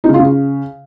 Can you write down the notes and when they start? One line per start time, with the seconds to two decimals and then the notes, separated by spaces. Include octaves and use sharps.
0.04 D#4
0.09 C#3
0.14 F4
0.19 C#3